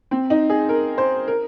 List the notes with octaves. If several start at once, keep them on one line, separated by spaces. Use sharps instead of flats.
C4
D#4
G#4
A#4
C5
A#4